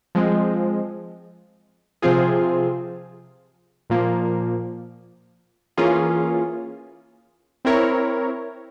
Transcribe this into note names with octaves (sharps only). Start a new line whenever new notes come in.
F3 G#3 C4
C3 F3 C4 F4 G#4
A#2 F3 A#3
E3 A#3 C#4 F4 G#4
C4 E4 A#4 C#5